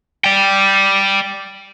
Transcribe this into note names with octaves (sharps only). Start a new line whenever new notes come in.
D5 G5